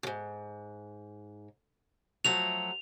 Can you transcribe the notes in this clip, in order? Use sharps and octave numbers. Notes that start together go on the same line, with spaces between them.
D#2 G#2
F3 F#3 A3 F7